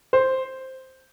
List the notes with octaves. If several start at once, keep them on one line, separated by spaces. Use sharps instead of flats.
C5